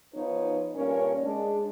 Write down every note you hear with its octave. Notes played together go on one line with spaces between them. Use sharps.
F3 B3 D#4 B4 C#5
G2 A#2 C#4 A#4 C#5
G#3 D4